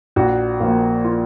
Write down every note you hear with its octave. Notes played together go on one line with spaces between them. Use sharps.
A#1 F#4
A#2 F3 A#3
F4